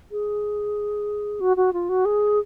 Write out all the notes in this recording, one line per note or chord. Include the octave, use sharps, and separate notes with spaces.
G#4
F#4
F#4
F4
F#4
G#4